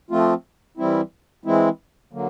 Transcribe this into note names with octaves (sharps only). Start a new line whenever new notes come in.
F3 A3 C4 F4
E3 G3 C4 E4
E3 G#3 C4 E4
D3 F#3 A#3